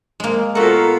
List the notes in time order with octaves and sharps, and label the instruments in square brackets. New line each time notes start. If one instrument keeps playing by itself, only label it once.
[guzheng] G#3 A#3
[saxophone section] B2 F4 A4 [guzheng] F#4 F#5 [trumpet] A#4